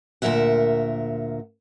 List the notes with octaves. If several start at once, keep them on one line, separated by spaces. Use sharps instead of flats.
D2 A#2 C#3 A#4 E5 F#5